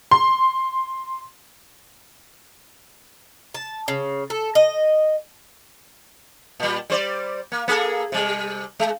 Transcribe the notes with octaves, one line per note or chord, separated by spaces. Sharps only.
C6
A5
C#3
A4
D#5
A#2 G3
G3 C5 D5
A#3
A#3 G#4 A4
C3 G3
G#3